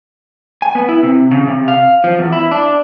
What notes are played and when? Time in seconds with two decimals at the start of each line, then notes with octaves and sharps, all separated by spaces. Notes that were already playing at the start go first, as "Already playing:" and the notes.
0.62 G#5
0.75 B3
0.89 E4
1.03 C3
1.31 C#3
1.47 C3
1.68 F5
2.04 F3
2.19 E2
2.32 E4
2.51 D4